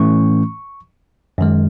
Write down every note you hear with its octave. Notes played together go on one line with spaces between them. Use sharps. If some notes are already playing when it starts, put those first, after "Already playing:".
Already playing: A2 E3 A3 C#4 C#6
F#2 D#3 G#3